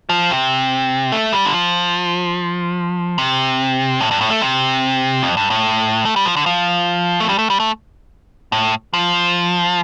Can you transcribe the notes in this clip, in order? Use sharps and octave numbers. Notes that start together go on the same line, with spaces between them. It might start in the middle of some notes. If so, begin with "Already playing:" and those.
F3
C3
A3
G3
D3
F3
C3
A2
G2
A2
A3
C3
F2
G2
A2
A3
G3
F3
D3
F3
A3
G3
A3
G3
A3
A2
F3